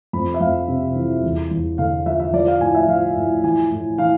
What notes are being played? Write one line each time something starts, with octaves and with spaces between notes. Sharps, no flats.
F2 B5
E5
F2 F5
C3
E3
E2
E2
D3 F5
F3 E5
E5
F3 D5
F5
A2 G#5
E5
F3 F5
A2
E3 G#5
A2
E3 F5